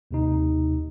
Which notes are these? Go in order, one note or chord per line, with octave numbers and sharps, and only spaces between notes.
D#2 C3 D#4